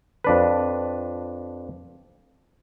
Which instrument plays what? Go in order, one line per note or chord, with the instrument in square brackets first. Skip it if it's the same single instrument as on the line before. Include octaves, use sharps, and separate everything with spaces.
[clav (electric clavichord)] F2 D4 B4